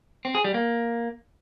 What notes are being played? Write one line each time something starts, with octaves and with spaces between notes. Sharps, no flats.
C4
G#4
G3
A#3